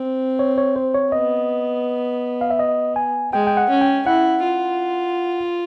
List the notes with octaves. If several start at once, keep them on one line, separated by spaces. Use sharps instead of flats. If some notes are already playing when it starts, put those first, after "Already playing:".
Already playing: C4
C#5
C#5
C5
C#5
B3 D#5
F5
E5
D#5
G#5
G#3 G5
G5
F#5
C#4
G5
E4 F#5
F4